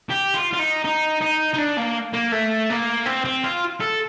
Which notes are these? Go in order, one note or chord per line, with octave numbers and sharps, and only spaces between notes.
G4
F4
F4
D#4
D#4
D#4
D#4
D4
A#3
A#3
A3
A#3
C4
C4
F4
A4